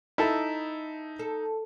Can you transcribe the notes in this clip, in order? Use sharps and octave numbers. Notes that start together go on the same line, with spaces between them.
D#4 E4 A4
A4